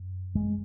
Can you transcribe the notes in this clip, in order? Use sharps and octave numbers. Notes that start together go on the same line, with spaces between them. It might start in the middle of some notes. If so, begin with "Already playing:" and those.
Already playing: F#2
G#3